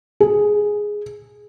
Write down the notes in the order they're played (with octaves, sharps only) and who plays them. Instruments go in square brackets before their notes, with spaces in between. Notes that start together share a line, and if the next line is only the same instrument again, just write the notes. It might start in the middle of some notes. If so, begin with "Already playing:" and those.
[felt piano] G#4